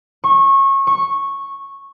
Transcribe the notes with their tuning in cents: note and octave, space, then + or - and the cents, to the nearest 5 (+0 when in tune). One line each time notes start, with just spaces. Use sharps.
C#6 -25
C#6 -10